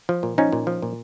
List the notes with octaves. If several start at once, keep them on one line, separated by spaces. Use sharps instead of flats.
F3
A#2
F3 C#4 D#4
A#2
F3
A#2